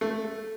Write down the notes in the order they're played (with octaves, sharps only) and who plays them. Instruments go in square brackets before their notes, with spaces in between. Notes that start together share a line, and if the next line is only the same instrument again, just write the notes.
[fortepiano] A3